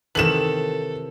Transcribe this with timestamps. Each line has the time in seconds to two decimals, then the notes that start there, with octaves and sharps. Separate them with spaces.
0.15 C3 D#3 E3 A4 E7 F#7